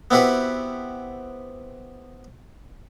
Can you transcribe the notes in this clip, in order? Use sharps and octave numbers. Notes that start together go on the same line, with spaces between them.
B3 C4 E4 F#4 G4 B4